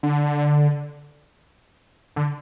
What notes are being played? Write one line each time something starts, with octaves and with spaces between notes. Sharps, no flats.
D3
D3